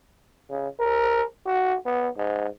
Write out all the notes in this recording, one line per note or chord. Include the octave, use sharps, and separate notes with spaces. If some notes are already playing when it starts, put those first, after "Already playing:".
C#3
A#4
F#4
B3
G#2